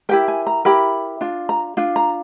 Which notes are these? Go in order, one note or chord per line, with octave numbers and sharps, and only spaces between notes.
E4 G4 A#4 G5
G#5
A#5
E4 G4 A#4 B5
D4 F4
A#5
D4 F4
A#5